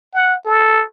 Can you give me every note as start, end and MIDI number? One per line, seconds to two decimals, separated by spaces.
0.14 0.36 78
0.46 0.84 69